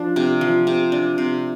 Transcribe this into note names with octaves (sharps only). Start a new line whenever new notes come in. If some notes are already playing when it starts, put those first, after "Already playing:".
Already playing: F3 D4
C3
F3
C3
D4
C3